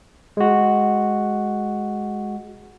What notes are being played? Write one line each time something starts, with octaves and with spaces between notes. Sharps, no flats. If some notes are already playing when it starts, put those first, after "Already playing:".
G#3 F#4